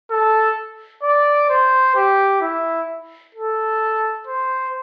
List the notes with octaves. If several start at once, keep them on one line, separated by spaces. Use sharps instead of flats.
A4
D5
C5
G4
E4
A4
C5